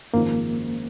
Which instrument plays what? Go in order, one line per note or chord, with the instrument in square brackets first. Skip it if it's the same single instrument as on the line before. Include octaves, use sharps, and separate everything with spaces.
[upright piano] G#1 F#2 F3 G#3 D#4 [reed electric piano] A#3